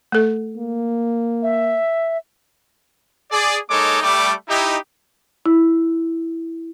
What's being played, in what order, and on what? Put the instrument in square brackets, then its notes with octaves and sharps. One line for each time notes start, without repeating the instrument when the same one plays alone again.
[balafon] A3 A4
[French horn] A#3
[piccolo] E5
[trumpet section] G#4 D5
G#3 A#3 D#4 A4 C#5 D6
G3 A3 D6
D#4 E4 G4
[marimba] E4